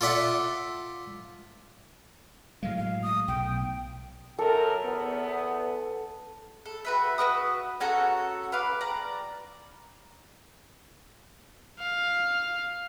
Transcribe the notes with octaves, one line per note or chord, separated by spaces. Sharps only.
F4 A4 D5 E5 F#5
A2 F#3 G#3 F5
F5
D#6
B1 G5
F#2 A4 A#4
E2 B3
A4
F#4 B4 E5
F#4 A#4 B4 D#6
C#4 F#4 A4 A#5
B4 F5 D6
D5 A#5
F5